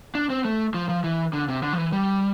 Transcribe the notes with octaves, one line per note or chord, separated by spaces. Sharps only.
D4
C4
A3
F3
F3
E3
D3
C3
D3
F3
E3
G3